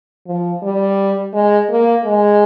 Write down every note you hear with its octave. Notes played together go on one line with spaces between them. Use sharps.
F3
G3
G#3
A#3
G#3